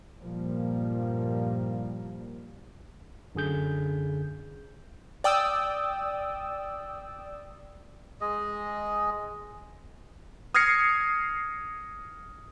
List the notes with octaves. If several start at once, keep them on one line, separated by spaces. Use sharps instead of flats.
G2 A#2 F3 G3 A#3
F#2 D3 G#4 G6
D5 G5 D#6 E6
G#3 G#4 D#5
D#6 F6 G#6 A#6 C7 C#7